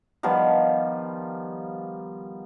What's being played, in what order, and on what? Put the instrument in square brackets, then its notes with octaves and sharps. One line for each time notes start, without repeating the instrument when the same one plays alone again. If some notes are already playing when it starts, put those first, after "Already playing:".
[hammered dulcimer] D#3 F3 G3 B3